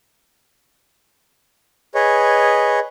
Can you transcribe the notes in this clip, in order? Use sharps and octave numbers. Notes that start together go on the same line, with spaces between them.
G#4 B4 C#5 D#5